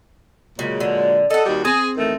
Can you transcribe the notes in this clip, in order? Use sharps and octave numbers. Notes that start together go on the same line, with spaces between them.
A#2 C#3 F#3 G#3
D3
A4 D#5 F#5
D#2 G3 F#4
C4 G#4
E2 D#3 A3